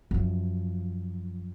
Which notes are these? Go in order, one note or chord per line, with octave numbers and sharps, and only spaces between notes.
F#2 F3